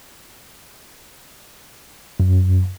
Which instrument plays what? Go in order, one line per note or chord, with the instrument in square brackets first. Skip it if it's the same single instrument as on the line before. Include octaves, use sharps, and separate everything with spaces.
[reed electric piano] F#2